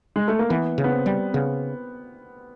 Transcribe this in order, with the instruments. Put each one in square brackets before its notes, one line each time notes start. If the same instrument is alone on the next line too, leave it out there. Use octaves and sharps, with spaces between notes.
[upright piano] G#3
A3
A#3
[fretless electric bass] E3 [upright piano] B3
[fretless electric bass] C#3
[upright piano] B3
C4
[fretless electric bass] G3
[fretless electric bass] C#3 [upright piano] B3